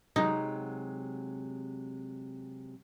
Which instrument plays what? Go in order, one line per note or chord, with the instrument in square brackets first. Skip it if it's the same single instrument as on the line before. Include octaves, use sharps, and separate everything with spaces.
[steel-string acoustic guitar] C3 F#3 G#3 [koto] D#4